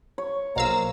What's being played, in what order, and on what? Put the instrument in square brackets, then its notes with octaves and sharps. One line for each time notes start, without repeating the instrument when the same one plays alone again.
[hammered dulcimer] C#5
[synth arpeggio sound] B1 F5 E6 [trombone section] A#3 C5 [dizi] A#5